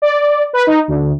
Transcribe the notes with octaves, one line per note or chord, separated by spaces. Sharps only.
D5
B4
D#4
D2